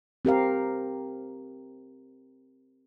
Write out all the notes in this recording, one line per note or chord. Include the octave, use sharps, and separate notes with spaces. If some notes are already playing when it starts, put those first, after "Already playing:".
C4 G4 A#4 F5